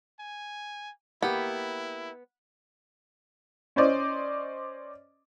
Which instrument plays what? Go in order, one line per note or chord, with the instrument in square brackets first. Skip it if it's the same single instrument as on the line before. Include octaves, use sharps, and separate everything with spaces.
[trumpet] G#5
[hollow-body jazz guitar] A#3 G4 [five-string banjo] B3 [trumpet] E4
[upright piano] C#4 C5 D5 D#5